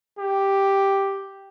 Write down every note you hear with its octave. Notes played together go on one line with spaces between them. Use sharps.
G4